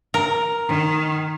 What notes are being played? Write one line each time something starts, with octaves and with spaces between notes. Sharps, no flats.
A#4
D#3